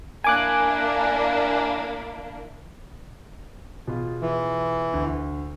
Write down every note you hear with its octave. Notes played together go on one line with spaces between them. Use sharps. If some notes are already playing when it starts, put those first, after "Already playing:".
A#3 D4 E4 G#5 D6 F#6
B2 F4 G#4
E3
D2